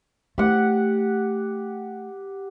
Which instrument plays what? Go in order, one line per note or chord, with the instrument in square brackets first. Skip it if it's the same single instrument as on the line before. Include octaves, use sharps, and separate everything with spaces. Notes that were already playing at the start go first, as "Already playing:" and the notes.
[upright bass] A3 [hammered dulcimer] G4 F#5